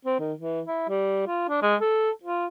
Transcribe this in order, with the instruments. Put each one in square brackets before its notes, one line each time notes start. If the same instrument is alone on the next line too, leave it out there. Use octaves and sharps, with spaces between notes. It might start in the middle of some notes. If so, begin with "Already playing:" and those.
[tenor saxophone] C4
D#3
E3
E4
G3
F4
D4
G#3
A4
F4